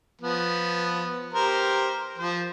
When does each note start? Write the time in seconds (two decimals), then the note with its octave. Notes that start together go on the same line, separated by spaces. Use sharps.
0.21 F3 B3
1.33 G4 A#4 C5
2.18 F3 C5